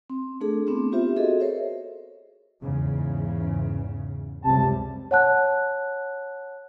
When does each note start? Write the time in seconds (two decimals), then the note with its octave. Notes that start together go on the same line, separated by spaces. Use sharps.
0.10 C4
0.41 A3 D4 G#4 A4
0.66 A3 B3 C4 D4 E4
0.92 B3 C4 F4 G4 C5 E5
1.16 F#4 G#4 A4 D#5
1.40 A#4 C5 C#5 E5
2.62 E2 G#2 C#3
4.44 C#2 F#2 C3 G3 A5
5.11 C#5 F#5 A5 F#6